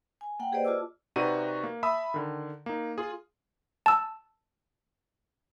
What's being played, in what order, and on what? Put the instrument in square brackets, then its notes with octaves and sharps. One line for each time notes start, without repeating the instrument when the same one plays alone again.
[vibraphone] G#5
A#3 F#5 G5
G4 G#4 B4 C5 D5 D#5
F4 A5 D6 E6
[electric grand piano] C3 D#4 F#4 B4 D5 D#7
A#3
E5 A5 B5 D#6 E6
D3 D#3
A#3 D#4
F4 G#4
[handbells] A5 E6